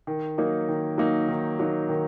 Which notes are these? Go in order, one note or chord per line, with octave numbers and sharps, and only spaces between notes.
D#3
F#3 A#3 D#4
D#3
F#3 A#3 D#4
D#3
F#3 A#3 D#4
D#3